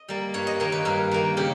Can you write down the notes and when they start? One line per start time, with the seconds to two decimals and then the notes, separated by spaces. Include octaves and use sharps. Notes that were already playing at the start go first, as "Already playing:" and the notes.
Already playing: D#5
0.09 G3 A#3
0.34 G2 C#5
0.47 D#5
0.60 D#3 A#3 C#5
0.72 B4
0.85 G2 A#4
1.11 D#3 A#3
1.37 C#3 G4